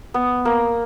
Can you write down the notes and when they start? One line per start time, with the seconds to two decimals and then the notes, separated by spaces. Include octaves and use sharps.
0.14 B3
0.45 A#3